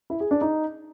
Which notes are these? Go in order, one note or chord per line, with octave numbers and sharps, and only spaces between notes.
E4
G#4
D4
D#4